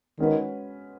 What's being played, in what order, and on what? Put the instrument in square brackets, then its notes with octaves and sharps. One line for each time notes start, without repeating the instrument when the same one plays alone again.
[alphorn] D#3 [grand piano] G#3 C#4 F#4 B4